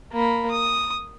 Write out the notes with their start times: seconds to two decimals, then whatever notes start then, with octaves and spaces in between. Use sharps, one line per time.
0.12 A#3 B5
0.51 D#6